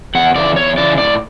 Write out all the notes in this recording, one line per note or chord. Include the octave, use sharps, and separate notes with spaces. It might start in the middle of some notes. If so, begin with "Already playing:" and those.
E2 F#5
C#3 E3 D5
E2 C#5
C#3 E3 D5
A2 D5